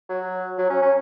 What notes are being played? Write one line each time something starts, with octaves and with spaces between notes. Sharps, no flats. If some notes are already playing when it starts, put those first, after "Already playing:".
F#3
F#3
C#4
C#4